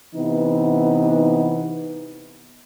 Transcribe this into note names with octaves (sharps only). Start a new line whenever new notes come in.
C3 E3 B3 D#4